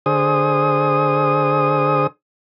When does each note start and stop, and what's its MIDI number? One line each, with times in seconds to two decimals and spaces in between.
0.06 2.07 50
0.06 2.07 68
0.06 2.07 72
0.06 2.07 87